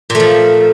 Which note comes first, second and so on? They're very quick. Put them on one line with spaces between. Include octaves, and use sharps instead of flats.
A#2 A3 F3